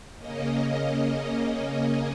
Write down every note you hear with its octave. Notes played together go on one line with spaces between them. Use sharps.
C#3 A#3 C#4 D#5
D#5